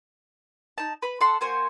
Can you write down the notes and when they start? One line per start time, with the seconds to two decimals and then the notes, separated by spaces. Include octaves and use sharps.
0.78 D#4 A5
1.02 B4 B5
1.21 A4 F#5 C6
1.41 A#3 F#4 C5 G#5